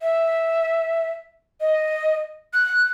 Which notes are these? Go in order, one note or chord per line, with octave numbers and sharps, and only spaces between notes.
E5
D#5
F#6